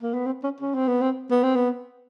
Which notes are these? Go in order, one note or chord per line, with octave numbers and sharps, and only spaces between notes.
A#3
B3
C4
C#4
C#4
C4
B3
C4
B3
C4
B3